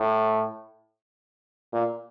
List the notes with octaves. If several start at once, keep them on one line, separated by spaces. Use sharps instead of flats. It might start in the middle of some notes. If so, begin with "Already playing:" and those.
Already playing: A2
A#2